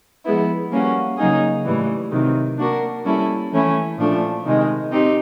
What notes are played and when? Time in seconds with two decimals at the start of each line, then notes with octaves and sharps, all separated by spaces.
0.24 F3 G#3 B3 E4
0.71 G3 A#3 C#4 F#4
1.17 C#3 F#3 A#3 D#4 G#4
1.64 A2 E3 G3
2.11 C3 D#3 F#3
2.58 A#3 D4 F#4 A#4
3.04 G3 A#3 C#4 E4 A4
3.51 E3 A3 C#4 E4
3.97 A#2 F3 A3 D4
4.44 C3 D#3 G#3
4.91 C4 D#4 G4